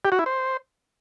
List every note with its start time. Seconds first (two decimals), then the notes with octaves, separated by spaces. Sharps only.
0.05 G4
0.12 F#4
0.19 E4
0.26 C5